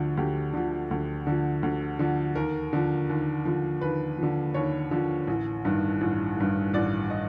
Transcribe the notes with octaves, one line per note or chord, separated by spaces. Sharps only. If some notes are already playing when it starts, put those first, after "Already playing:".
Already playing: D2 D3 F3
D2 G4
D3 F3
D2
D3 F3
D2
D3 F3
D#2 A#4
D3 F3
D#2
D3 F3
D#2 B4
D3 F3
D#2 C#5
D3 F3
A1
G2 D#3
A1
G2 D#3
A1 D5
D#5